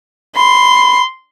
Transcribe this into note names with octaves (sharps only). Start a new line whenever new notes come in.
B5 C6